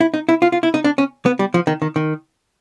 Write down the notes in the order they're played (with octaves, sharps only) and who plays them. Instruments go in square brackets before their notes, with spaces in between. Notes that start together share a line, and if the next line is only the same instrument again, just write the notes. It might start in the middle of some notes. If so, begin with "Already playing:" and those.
[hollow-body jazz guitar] E4
D#4
E4
F4
F4
E4
D#4
D4
C#4
B3
G3
F3
D#3
D#3
D#3